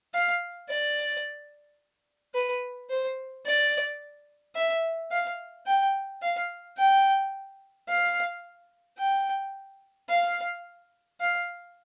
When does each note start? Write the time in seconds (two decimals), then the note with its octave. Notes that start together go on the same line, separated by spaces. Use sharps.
0.14 F5
0.69 D5
2.35 B4
2.89 C5
3.46 D5
4.55 E5
5.11 F5
5.67 G5
6.22 F5
6.77 G5
7.88 F5
8.98 G5
10.09 F5
11.20 F5